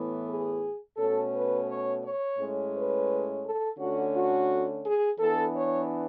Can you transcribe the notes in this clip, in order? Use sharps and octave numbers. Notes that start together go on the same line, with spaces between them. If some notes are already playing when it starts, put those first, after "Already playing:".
Already playing: A2 E3 B3
G#4
B2 A3 C#4 A4
B4
C#5
C#5
A2 G#3 C#4
B4
A4
D3 A3 C#4 F#4
F#4
G#4
E3 B3 D4 A4
C#5